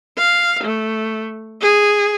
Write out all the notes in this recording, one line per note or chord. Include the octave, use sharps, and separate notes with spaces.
F5
A3
G#4